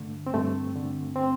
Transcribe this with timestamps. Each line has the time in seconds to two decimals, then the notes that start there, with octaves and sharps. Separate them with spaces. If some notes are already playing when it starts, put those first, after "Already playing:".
Already playing: G2 D3 A3
0.27 C4
0.34 G2 A3
0.75 D3
1.16 C4